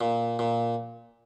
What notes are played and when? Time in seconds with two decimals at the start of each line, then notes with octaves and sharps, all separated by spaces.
0.01 A#2
0.39 A#2